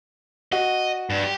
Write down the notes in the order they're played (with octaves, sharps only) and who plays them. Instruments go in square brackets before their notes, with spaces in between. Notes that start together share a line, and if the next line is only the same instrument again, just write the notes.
[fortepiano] F#4 [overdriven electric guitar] D#5
[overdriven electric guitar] G2
G4